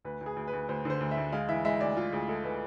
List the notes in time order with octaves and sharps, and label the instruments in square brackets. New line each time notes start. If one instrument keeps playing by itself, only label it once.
[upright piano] D2 B4
D2
G#4
D2
B4
D2
D2 C5
D3 C5
D2
E5
D2
G#3 F5
E3 E5
G#3 E5
D2 D5
G#3 F4
D2 G#4
G#3 A4
G#3 B4